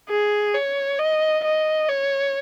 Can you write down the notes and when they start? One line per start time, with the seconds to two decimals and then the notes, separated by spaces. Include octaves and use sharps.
0.10 G#4
0.55 C#5
0.99 D#5
1.45 D#5
1.89 C#5